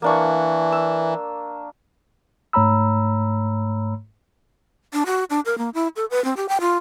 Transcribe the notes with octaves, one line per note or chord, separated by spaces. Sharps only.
E3 A#3 D4 C#6
E6
G#2 A3 C#5 A#5 B5 E6
D4
F#4
D4
A#4
A#3
E4
A4
B4
C4
G4
G5
F4